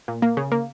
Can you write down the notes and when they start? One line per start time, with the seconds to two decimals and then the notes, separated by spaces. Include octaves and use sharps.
0.08 A#2
0.22 A#3
0.37 C#3
0.52 A#3